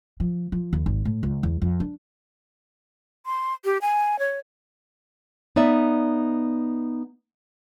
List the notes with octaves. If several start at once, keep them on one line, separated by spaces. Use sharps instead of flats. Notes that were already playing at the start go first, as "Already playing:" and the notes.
F3
F3
D#2
G#1
A2
C#2
E2
F2
D4
C6
G4
G#5
C#5
B3 D#4 D5 E5